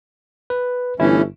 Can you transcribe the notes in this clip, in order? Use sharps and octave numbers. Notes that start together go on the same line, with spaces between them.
B4
G1 E3 A3 C#4 E4